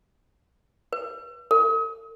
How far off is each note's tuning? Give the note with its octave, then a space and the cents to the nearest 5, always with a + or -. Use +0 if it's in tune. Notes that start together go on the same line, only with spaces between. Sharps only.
B4 -35
A4 +45